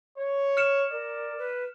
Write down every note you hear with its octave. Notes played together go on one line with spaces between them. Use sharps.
C#5
F6 C#7 E7
A#4 D5
B4